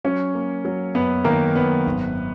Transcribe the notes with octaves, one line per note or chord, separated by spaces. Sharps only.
F#3 C#4 C#5
A#3
F#3
F#2 B3 B4
D#3 A#3 A#4
F#2 B3 B4
G#1